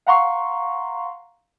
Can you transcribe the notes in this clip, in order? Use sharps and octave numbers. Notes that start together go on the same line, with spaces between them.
F5 F#5 A#5 C6 C#6